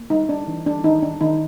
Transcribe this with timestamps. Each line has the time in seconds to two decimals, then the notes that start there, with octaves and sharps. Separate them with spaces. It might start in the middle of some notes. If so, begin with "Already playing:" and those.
Already playing: A#3
0.10 G3 D#4
0.29 D4
0.47 E3
0.66 D4
0.84 D#3 D#4
1.02 D4
1.21 D#3 D#4